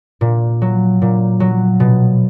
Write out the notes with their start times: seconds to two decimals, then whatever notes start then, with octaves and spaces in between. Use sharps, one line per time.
0.21 A#2
0.62 F#3
1.02 A#2
1.40 F#3
1.80 B2